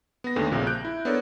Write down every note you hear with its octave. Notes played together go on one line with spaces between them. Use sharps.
B3 A#6
D#2 D3 A3
A#1 A#2 C#3 C4
F#6 G6 D7
E4
B3 D4 A4 A#4 C#5 D5